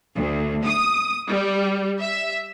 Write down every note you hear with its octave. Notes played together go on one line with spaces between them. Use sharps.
D2
D#6
G3
E5